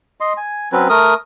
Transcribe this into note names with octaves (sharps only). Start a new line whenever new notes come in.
D#5 C6
G#5
F#3 C4 C#4 B4
A3 A#4 D#6